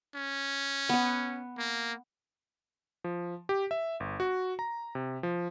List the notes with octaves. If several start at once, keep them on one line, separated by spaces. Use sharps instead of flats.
C#4
B3 F#5
A#3
F3
G4
E5
G1
F#4
A#5
C3
F3